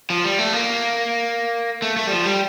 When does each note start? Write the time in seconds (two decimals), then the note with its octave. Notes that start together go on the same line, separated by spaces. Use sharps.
0.10 F3
0.24 G3
0.39 A3
0.53 A#3
1.82 A3
1.97 A3
2.07 G3
2.11 F3
2.26 G3